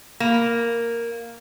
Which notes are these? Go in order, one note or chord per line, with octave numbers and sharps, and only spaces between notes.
A#3